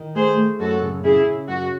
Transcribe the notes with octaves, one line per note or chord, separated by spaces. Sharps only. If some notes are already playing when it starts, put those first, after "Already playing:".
Already playing: D#3
A3 G#4 C5
A3
F#2 F#4 A4
C#3
C#3 E4 G#4
C#3
F#2 F#4